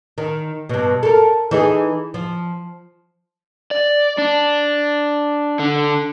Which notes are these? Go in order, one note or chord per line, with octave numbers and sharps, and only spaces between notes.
D#3
G2 B2
A4 A#4
E3 D#4 G#4
F3
D5
D4
D3